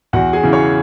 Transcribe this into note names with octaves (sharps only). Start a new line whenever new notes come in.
E2 F#4 F#5
G#4 G#5
C#3 E3
C#5 C#6